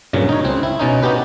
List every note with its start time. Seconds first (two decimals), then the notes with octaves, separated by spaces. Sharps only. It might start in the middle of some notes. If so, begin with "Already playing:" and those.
0.13 G2 A#2 C#3 F#3
0.29 D#4 C#5
0.44 C#2 C4
0.63 E4
0.79 B2 C#4 D#4
1.03 B3 D#4 F#4 G4 B4